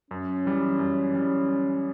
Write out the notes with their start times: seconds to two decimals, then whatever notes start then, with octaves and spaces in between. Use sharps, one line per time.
0.11 F#2 C#4
0.45 E3 G3
0.79 F#2
1.13 E3 G3